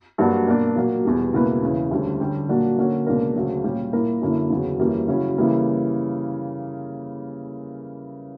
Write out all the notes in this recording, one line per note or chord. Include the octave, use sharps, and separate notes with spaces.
G2 F#3 A#3 D4 F#4
B2 A#3 D4
A#2 F#3 A#3
E2 B2 G3
C#2 B2 A#3 E4 B4
E2 C#3 E3
D2 D3 G3 C#4
D3 G3 C#4 G4
A#2 F#3 A#3 D4 F#4
D3 A#3 C#4 F#4
C#2 B2 A#3 D4 A#4
D2 C#3 F#3
A#2 G3 C#4 G4
A#2 A#3 E4 A#4
F#2 D3 A#3 E4
E2 C#3 F#3
F#2 E3 G3 A#3
C#3 F#3 C#4 E4
C#3 E3 G3 A#3 E4